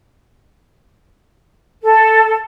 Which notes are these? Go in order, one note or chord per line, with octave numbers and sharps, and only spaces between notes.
A4